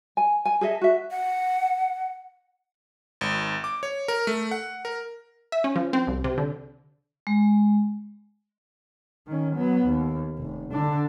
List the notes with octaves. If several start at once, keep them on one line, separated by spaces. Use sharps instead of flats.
G#5
G#5
G#4 A4 D#5 E5
F#4 E5
F#5
G#1
D6
C#5
A#4
A3
F#5
A#4
E5
C#4
F3
C4
C2
C3
D3
G#3
D#3 C#4
F#3 B3
D#2
F1
D3 D4